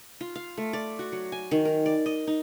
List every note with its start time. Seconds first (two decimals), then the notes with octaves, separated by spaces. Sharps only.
0.21 F4
0.35 F5
0.57 A3
0.73 D5
0.99 F#4
1.12 F#3
1.32 G#5
1.51 D#3
1.65 A#4
1.86 D5
2.06 D#5
2.27 D#4